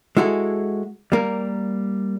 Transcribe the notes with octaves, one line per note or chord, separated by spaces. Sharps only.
G#3 E4 F#4 G#4 A4
G3 A#3 A#4